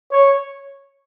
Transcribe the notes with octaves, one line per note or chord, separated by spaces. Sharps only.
C#5